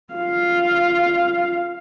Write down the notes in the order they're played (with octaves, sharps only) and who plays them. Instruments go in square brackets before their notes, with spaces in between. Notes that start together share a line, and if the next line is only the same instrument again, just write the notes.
[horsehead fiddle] F4 F5